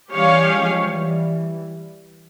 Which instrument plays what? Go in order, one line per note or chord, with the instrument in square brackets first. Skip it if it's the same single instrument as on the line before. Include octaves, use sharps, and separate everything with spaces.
[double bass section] E3 G3 [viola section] C#4 G4 C#5 F5
[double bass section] F3 G#3
E3 G3